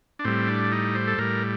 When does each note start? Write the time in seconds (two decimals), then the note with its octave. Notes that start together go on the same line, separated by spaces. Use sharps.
0.19 D4
0.24 A2 G3 C4
0.48 D4
0.72 D#4
0.95 C5
1.07 A4
1.18 A2 G3 A#4